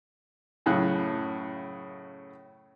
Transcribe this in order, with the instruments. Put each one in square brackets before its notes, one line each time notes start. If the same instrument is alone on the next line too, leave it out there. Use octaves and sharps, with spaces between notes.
[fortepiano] F#2 A2 C#3 F5 F#6